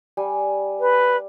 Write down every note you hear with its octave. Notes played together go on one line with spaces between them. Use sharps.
G3 G#5
B4